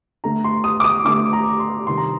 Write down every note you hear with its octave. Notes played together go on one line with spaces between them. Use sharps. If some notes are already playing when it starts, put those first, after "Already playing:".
D3 A3 A#5
C6
D#6
D6
D#6
D3 A3 D6
A#5
C6
C3 D#3 G3 C6
A#5